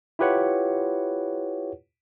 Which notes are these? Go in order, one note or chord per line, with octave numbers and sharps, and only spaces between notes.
E4 F4 G4 B4 C#5 F#5